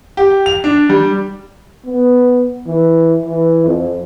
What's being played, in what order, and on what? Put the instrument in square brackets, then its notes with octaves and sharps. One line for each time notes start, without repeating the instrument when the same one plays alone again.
[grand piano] G4
F7
D4
G3
[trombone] B3
E3
E3
F2